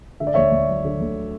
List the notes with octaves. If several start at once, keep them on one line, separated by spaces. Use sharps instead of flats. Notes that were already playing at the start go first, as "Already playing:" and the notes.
D3 E5
D5
D2 C#5 E5
D2
F#3
D3
D2